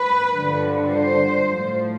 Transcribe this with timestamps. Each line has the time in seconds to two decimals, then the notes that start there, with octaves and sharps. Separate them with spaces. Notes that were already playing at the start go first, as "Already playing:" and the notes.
Already playing: B4
0.32 G2 D3 F3
0.89 C5
1.48 A2 F3